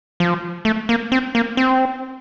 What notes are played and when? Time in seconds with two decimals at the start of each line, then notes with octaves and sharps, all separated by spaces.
0.20 F3
0.65 A3
0.89 A#3
1.12 C4
1.35 A#3
1.57 C4